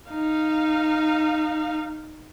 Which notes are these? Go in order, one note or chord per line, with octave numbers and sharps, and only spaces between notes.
D#4 F5